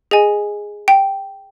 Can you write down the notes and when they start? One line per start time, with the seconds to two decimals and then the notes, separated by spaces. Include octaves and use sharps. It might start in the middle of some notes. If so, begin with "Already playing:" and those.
0.11 G#4 D#5 G#5
0.88 G5